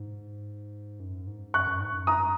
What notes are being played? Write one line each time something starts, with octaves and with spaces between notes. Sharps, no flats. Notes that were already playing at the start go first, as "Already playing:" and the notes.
Already playing: G#2
F#2
G#2
F#2 C#6 F#6
F#2
G#2
F#2
A#5 D#6